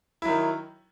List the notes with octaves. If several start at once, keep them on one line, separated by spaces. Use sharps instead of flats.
D#3 F#3 E4